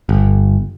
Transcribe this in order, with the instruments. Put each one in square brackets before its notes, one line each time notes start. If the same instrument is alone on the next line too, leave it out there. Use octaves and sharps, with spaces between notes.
[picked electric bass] G1